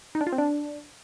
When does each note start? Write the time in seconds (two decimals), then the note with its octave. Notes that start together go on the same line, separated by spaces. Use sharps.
0.15 D#4
0.21 D4
0.27 F4
0.32 C4
0.38 D4